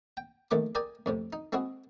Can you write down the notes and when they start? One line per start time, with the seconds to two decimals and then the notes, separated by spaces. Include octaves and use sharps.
0.17 G5
0.51 A#1 D#3 A3 C#5 D6
0.75 G#4 A#4 D5 G5 G#5
1.06 F2 A2 C3
1.33 D#4
1.52 G#3 C4 E4 F#4 G#4